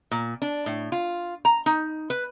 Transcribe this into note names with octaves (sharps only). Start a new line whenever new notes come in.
A#2
D4
A2
F4
A#5
D#4
B4